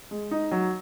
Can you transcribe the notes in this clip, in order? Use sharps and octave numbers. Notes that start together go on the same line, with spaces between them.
G#3
D#4
F#3